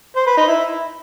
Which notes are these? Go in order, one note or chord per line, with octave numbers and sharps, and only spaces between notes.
C5
B4
D#4
E4